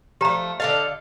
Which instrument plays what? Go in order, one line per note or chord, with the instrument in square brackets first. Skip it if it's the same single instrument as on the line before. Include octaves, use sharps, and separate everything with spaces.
[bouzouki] F3 A3 [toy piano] G4 A#5
[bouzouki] D3 A4 F5 [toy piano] D#5